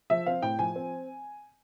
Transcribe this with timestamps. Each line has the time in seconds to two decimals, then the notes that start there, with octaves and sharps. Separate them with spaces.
0.10 F3 E5
0.26 C4 F5
0.42 A2 G5
0.59 F3 G#5
0.76 C4